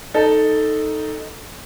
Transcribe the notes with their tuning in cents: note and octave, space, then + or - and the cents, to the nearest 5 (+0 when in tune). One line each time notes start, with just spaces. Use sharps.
D#4 +0 A4 +0